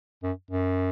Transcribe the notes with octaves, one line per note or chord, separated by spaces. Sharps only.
F#2
F#2